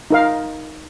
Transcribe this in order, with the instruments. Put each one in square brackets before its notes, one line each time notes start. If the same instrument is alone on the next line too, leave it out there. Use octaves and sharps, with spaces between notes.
[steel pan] D#4 A#4 F5